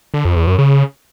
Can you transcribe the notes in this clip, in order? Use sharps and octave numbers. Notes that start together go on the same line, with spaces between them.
D3
F2
E2
F#2
C#3